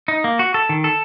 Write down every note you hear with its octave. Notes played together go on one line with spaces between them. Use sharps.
D#4
A#3
F#4
A4
D#3
A4